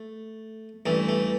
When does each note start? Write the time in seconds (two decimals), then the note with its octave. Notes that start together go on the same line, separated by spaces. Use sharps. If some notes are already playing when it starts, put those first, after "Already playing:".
Already playing: A3
0.86 A1 G2 E3 A3
1.09 A3